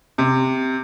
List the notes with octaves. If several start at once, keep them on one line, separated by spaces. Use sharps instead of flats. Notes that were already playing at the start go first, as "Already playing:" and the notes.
C3